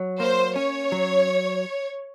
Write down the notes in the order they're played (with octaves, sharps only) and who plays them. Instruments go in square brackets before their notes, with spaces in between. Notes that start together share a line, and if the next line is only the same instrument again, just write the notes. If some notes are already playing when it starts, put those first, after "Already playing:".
Already playing: [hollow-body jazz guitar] F#3
[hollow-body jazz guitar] A#3 [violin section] C5
[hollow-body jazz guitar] C#4 [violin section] C#5
[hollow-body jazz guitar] F#3